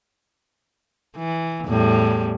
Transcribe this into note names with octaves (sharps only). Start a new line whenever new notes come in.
E3
E2 A2 G3